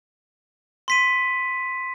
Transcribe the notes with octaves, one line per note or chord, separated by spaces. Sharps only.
C6 B6 D#7